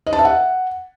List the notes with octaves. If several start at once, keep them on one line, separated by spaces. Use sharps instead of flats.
D#5
A5
E5
F#5